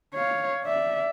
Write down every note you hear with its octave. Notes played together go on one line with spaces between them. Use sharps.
C#5 F5
D5 E5